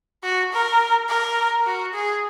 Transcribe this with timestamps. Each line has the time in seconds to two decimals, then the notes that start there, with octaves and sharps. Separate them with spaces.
0.23 F#4
0.52 A#4
1.09 A#4
1.66 F#4
1.94 G#4